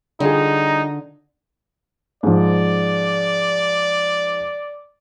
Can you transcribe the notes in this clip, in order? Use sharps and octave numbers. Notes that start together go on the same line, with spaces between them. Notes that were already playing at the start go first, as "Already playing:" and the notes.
D3 G3 D#4 F4 G#4
G#2 F3 D5